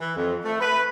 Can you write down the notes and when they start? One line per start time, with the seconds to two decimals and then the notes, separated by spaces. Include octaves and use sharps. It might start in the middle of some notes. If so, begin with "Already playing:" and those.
0.01 E3
0.16 F2
0.45 A3
0.60 B4